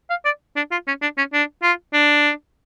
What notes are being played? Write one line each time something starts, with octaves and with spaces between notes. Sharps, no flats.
F5
D5
D4
F4
C#4
D4
C#4
D4
F4
D4